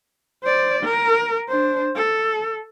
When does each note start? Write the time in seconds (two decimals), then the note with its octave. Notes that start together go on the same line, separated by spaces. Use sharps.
0.43 C5 D5
0.83 A#4
1.49 D4 C5
1.96 A4